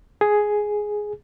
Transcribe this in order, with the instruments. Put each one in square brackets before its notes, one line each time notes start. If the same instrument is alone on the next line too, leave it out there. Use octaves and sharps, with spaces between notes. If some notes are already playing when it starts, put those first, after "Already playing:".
[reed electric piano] G#4